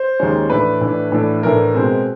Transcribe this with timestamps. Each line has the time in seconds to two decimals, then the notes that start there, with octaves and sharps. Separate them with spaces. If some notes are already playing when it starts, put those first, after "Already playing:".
Already playing: C5
0.20 D#2 D#3 G#3 C#4
0.50 A2 E3 A3 D4 B4
0.81 A2 E3 A3 D4
1.12 A2 E3 A3 D4
1.43 A2 E3 A3 D4 A#4
1.75 B2 G#3 C4